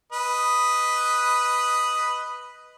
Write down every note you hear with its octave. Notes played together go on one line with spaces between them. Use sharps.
B4 D#5